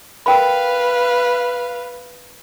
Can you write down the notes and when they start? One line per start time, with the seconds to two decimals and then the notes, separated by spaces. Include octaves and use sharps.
0.26 A#4 B4 F5 G5 B5